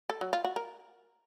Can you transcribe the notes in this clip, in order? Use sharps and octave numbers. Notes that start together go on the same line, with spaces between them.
A4
F#3
F4
F#4
A#4